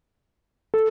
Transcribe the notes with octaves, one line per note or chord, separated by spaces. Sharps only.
A4